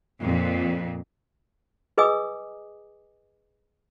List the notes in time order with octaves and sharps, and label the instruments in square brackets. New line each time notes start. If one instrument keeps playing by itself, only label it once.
[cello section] F2 A#2
[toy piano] G#4 B4 D#5 G#5 D6 D#6